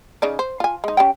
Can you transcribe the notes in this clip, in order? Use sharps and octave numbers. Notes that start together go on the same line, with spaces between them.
C#3 D#4 D5
C5
F4 G#5
G#3 D#4
C#4 G4 G5